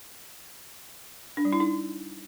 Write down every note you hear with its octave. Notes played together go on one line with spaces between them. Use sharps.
D4
G3
E4
D#4